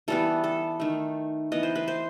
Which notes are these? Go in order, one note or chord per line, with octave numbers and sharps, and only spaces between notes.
E3 G3 B3 A4
A4
D#3 A3
E3 B3 D#5
C5
B4
C5